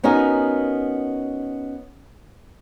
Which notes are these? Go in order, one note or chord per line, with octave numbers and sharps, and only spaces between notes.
B3 C#4 D#4 F#4 A#4